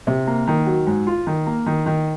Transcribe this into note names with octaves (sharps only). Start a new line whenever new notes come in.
C3
A#3
D#3
F#3
G#2
F4
D#3
A#3
D#3
D#3